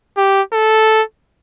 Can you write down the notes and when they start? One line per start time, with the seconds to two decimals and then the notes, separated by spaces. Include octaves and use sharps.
0.17 G4
0.53 A4